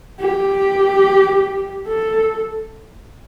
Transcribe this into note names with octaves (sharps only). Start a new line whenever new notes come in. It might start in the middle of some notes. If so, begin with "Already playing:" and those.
G4
A4